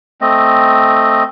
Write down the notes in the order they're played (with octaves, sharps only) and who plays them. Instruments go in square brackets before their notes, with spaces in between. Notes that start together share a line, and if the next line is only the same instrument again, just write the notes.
[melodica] A3 C4 D#5